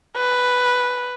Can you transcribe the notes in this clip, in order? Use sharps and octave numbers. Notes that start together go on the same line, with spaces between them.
B4